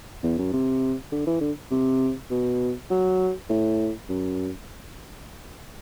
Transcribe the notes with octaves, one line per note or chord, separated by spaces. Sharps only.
E2
F#2
C3
D3
E3
D3
C3
B2
F#3
A2
F#2